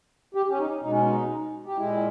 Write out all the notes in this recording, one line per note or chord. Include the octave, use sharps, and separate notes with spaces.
G4
C#4
D#4
B2 G#3 D#4
C#4
D#4
G4
A#2 G#3 E4